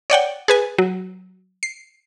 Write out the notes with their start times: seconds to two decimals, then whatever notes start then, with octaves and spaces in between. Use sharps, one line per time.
0.10 C#5 D5 F#5 G5
0.48 G#4 B4 G#5
0.78 F#3
1.63 C7